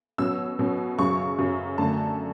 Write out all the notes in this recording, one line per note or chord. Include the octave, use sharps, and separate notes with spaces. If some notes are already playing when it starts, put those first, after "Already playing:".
B2 F#3 C#4 E6
B2 F#3 C#4
F#2 C#3 F#3 C#6
F#2 C#3 F#3
F#2 D3 A3 A5